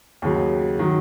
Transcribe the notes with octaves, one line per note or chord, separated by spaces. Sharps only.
D#2 C#3 F#3
D#3 F#3